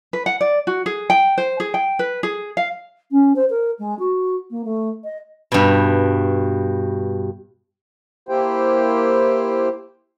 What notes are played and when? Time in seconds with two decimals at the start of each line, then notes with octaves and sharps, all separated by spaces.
0.13 B4
0.26 F#5
0.41 D5
0.67 F#4
0.86 G#4
1.10 G5
1.38 C5
1.60 G#4
1.74 G5
1.99 B4
2.23 G#4
2.57 F5
3.11 C#4
3.36 C5
3.50 A#4
3.79 G#3
3.99 F#4
4.51 A#3
4.65 A3
5.04 D#5
5.52 G2 B2
8.29 A#3 E4 G4 C5 G5